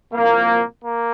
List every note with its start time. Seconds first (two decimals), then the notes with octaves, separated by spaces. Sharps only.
0.13 C2 A#2 F3 A#3
0.84 A#3